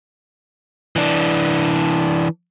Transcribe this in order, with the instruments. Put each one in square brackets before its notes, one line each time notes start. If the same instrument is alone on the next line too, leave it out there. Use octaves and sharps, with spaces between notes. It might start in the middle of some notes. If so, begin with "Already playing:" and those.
[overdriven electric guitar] E3 D4